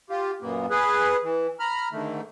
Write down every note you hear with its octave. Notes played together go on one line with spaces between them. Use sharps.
F4 G4
F#2 A#2 A#3 B3
G#4 B4
E3
A#5 B5 F6
G#2 D3 D#3 A3